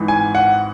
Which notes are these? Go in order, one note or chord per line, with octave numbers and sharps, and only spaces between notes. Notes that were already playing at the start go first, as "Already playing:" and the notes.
Already playing: G#1 G#2 E3
G#5
F#5